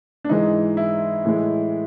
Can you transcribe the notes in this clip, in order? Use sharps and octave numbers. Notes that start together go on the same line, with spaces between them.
D4
G#2 E3 G#3 D#4
E4
A2 E3 G#3